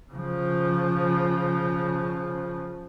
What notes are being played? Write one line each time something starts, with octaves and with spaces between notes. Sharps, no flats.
C#3 F3